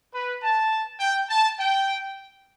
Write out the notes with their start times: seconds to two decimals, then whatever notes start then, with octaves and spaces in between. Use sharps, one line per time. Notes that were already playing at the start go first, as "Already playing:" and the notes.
0.14 B4
0.43 A5
1.00 G5
1.30 A5
1.58 G5